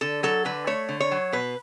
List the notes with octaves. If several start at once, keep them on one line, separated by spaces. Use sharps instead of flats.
D3 A4
F#3 A4
D3 B4
A3 C#5
D3
C#5
F#3
B2 B4